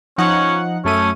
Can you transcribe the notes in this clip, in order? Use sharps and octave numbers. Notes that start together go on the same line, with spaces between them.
F3 C#4 D#4 F#5
F#2 A3 C#4 D#7